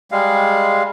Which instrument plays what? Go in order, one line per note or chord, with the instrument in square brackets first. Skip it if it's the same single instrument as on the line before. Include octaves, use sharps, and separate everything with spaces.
[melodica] G3 G#3 F5